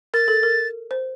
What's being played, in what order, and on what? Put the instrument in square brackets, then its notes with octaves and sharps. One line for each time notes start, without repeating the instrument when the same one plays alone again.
[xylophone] A#4 [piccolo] A6
[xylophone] A4
A#4
C5